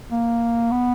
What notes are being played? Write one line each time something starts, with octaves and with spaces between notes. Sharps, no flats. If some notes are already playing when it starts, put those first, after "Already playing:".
A#3
B3